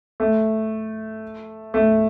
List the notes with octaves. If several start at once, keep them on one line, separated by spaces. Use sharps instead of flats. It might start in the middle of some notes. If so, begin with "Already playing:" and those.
A3
A3